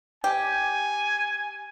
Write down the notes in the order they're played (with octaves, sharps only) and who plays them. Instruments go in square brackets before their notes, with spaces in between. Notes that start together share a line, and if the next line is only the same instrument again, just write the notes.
[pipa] G4 [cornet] G#5